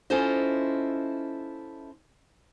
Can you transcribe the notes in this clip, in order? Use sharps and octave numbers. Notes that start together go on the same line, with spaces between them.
C#4 E4 F4 A4 C5 D#5